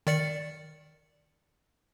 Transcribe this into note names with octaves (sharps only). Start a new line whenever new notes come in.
D#3 D5 C#7